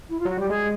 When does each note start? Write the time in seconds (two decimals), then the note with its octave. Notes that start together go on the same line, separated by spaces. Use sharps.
0.09 E4
0.19 F4
0.25 F#3 F#4
0.37 G3 G4
0.49 G#3 G#4